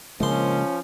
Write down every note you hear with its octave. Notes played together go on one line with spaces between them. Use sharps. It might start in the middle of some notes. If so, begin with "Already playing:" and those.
A#1 C#3 F3 G#3 C#4 C6